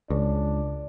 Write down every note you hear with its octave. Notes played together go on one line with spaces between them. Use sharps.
C#2 D4